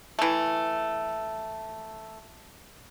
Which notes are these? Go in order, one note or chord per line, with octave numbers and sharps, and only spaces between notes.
E3 A3